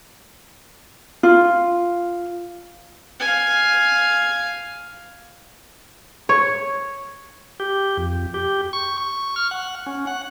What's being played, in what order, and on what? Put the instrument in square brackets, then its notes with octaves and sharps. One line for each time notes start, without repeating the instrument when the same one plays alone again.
[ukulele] F4
[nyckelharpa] F5 G#5
[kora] C#5
[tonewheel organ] G4
F2
G4
C#6
C#6
F6
F#5
C#4
F#5